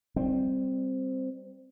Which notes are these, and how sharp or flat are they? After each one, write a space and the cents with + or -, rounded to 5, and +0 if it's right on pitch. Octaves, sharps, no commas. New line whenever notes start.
G3 +0 C4 +0